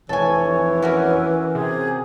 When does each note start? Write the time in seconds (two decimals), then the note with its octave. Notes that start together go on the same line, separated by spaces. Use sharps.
0.09 F1 E3 A4 C#5 G#5
0.83 C#4 F#4 A#4
1.55 C3 G#4